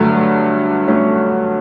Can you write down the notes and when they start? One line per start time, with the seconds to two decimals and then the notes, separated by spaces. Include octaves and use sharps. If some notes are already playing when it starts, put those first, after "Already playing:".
Already playing: G2 D3 F#3 A3
0.88 A3 C#4